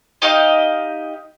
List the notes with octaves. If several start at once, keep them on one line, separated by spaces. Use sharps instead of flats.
D#4 G4 D#5 F5